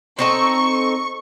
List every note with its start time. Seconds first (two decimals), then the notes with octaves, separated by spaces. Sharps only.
0.19 C4 D#4 A4 C#6